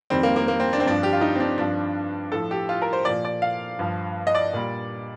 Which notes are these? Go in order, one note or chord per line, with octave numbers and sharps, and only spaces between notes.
F2 D#3 G3 C4
A#3
A#3
A#3
C4
D4
C4
G2 F3 D4
G4
F4
D#4
C4
D4
G2 F3 D4
A2 F3 A4
G4
F4
A#4
C5
A#2 F3 D5
D5
F5
G2 F3
D#5
D5
A#2 G3